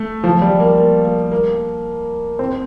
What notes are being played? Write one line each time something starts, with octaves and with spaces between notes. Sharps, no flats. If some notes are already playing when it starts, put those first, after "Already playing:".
Already playing: A3
F3
G3
A#3
A#3
A#3
A#3
C4